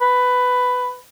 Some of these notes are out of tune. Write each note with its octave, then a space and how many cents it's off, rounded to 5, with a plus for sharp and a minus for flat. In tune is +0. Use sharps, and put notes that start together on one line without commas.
B4 +10